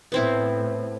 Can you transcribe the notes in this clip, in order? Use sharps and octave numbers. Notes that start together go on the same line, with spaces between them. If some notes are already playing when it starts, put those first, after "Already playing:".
A2 B3 C4 E4